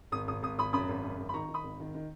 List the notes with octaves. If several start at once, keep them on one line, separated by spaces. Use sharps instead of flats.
G#1 D#6
G#1 D#6
G#1 D#6
G#1 B5 D#6
F#2 B5 D#6
G#1
F#2
G#1
B5
D#3 A#5 C#6
D#3
B5 D#6
G#1
D#3
D#3